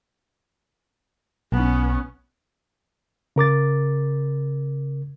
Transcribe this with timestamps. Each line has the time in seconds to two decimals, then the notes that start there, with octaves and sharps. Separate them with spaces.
1.52 B1 B3 C#4
3.36 C#3 A#4 D6 A6